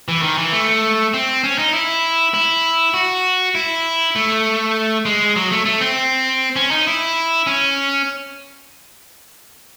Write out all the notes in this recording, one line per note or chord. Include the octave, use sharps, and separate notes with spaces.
E3
D#3
E3
A3
C4
C#4
D#4
E4
E4
F#4
E4
A3
G#3
F#3
A3
A3
C4
C#4
D#4
E4
C#4